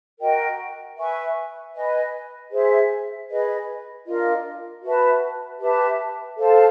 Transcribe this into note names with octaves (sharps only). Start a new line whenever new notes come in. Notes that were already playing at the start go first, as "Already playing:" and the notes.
F#4 A#4 D#5 G5
B4 E5 G#5 C#6
B4 D#5 G#5
G#4 C5 E5
G#4 B4 D#5
D4 F4 A#4 D#5
F#4 B4 E5 A5
G4 B4 E5 A5
A4 C5 F5 A5